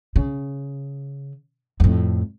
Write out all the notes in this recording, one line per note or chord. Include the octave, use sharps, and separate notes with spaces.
C#3
F2 A2